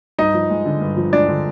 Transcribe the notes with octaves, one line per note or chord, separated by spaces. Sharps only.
G2 D#4 D#5
F3
G#3
D3
G2
F3
G#3 D4 D5
D3